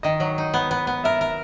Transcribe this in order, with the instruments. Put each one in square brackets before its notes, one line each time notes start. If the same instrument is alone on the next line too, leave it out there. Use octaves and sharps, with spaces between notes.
[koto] D#3 [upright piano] D#5
[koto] F#3
D#4
B3
B3
B3
[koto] A#4 [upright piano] E5
[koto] A#4